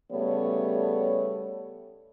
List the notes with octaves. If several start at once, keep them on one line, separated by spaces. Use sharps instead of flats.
C#3 G3 A3 B3 C#5